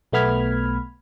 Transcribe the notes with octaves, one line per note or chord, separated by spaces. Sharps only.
B1 A3 B3 B5 F6 G#6